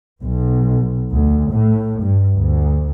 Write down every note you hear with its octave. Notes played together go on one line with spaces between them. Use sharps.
B1
D2
A2
G2
D2